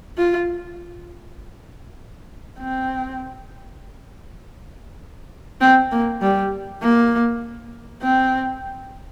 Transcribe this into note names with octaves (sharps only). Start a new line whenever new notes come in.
F4
C4
C4
A#3
G3
A#3
C4